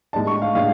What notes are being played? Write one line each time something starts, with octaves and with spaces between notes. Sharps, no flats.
A2 G#3 D4 A5
C#6
F5
A2 G#3 D4 F5